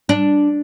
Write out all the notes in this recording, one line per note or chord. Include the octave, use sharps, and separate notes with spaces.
D4